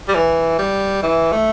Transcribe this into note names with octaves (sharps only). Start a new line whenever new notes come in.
G3
E3
G3
E3
A3